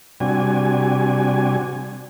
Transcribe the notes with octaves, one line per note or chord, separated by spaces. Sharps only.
C3 G3 D4 F#4 G#5